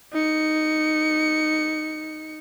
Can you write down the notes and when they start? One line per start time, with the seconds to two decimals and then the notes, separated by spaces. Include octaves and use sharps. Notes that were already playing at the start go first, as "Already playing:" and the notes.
0.13 D#4 C#7